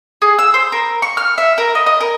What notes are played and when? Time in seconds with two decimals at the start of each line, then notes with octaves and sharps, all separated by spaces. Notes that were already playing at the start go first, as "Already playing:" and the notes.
0.22 G#4
0.39 E6
0.54 C5
0.72 A#4
1.02 C#6
1.17 F6
1.38 E5
1.58 A#4
1.75 D#5
1.86 D#5
2.00 A#4